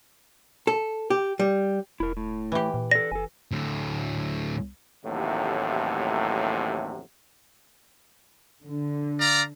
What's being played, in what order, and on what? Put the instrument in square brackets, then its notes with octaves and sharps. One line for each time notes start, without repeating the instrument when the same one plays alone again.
[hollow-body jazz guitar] A4
G4
G3
[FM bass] E1 [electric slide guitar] E4 A#4
[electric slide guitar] A2
[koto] E3 G4
[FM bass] A#2
[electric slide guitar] A4 D5 [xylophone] A#6
[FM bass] F#1 [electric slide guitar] A4 G#5
[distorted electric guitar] D2 A2
[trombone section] A1 D#2 A2 C3 F#3
[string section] D3
[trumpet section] D5 F5 A#5